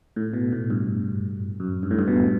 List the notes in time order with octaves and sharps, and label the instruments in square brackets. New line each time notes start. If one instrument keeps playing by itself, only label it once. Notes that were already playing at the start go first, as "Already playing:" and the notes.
[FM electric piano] A2
B2
A2
G2
F#2
G2
A2
G2
B2